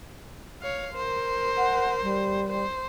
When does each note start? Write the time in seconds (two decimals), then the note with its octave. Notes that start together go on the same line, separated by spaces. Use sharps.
0.62 C#5 F5
0.94 A#4 C5
1.57 F#5
2.02 G3
2.49 C5